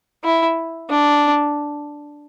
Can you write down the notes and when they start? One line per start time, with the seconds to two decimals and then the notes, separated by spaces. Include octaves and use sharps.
0.24 E4
0.90 D4